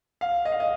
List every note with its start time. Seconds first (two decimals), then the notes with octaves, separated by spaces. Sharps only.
0.21 F5
0.45 D#5
0.52 F5
0.60 D#5